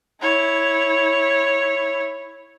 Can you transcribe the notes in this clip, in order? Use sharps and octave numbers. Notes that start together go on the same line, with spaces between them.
E4 C#5